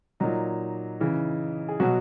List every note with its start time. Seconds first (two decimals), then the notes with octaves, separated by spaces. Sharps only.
0.20 A#2 F#3 D#4
1.01 C#3 E3
1.68 G#4
1.80 B2 F#3 F#4